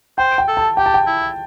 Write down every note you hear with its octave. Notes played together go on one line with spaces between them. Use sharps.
C5 G5
G5
A4
A5
G4 G5
A5
G5
E4